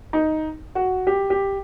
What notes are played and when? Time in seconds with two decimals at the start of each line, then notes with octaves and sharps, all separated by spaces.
0.13 D#4
0.75 F#4
1.07 G4
1.30 G4